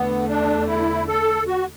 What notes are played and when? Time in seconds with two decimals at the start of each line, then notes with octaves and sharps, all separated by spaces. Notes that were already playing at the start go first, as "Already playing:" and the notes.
Already playing: E2 D3 A3 B3
0.29 D4
0.68 E4
1.08 A4
1.48 F#4